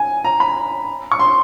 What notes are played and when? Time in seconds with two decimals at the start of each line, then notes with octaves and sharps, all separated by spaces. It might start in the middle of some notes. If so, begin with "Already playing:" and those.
Already playing: G#5
0.24 A#5
0.40 B5
1.12 C#6
1.19 C6